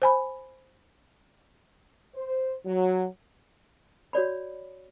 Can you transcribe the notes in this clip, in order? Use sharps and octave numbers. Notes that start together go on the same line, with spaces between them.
C5 G#5 B5
C5
F#3
F#4 C#5 D5 B5